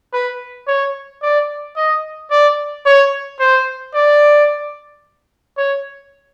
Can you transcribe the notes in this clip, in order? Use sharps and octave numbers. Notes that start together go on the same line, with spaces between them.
B4
C#5
D5
D#5
D5
C#5
C5
D5
C#5